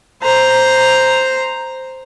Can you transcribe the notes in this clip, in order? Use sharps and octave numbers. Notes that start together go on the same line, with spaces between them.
C5 A#5